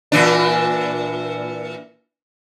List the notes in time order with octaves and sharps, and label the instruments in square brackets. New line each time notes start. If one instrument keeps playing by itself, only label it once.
[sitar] A#2 E3 D4